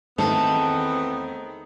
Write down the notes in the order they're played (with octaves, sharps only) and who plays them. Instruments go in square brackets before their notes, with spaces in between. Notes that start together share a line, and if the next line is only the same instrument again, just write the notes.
[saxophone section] E2 B3 C4 [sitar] D#3 [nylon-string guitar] A3 A4